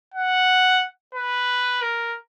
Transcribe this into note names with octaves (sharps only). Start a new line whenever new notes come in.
F#5
B4
A#4